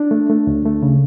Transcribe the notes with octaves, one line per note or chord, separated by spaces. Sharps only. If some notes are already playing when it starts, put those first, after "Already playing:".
Already playing: D4
A3
A3
D2
A3
C#3